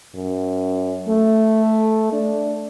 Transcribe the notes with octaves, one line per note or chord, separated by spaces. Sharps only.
F#2
A3
D4